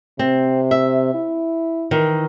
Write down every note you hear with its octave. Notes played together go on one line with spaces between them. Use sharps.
C3 C4
E5
E4
D#3 E3